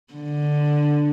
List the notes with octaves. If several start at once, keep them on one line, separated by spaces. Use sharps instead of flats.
D3